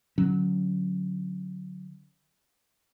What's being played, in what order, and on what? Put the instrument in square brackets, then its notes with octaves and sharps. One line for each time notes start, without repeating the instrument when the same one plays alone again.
[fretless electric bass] D3 F#3 C#4